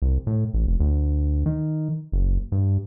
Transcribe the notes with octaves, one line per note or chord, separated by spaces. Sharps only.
C2
A2
A1
F1
D2
D#3
F#1
G2